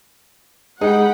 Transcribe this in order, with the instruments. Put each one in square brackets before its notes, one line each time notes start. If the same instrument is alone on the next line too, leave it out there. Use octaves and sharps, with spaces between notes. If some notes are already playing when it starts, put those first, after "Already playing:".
[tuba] G#3 [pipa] D#4 [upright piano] G#4 [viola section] F#5 G5 B5